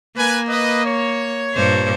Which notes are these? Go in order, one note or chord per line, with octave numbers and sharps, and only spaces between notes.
A#3 B4 G#5
B4 D#5
C#5
G2 A#2 C5